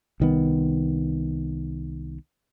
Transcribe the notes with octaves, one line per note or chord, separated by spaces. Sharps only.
C2 D#3 B3